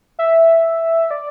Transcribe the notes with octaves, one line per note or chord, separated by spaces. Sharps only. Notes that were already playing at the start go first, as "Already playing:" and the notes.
E5
D5